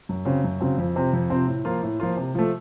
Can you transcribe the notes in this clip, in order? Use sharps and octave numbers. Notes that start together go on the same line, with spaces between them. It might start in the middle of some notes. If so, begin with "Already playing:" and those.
F#2
C#3 F#3 C4
F#2
C#3 F#3 C4
F2
C3 F3 C4
F2
C3 F3 C4
A2
F3 A#3 F4
A2
F3 A#3 F4
C3
F3 A3